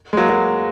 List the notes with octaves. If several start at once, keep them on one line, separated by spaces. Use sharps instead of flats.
G#3
F#3 A#3
F#3 A#3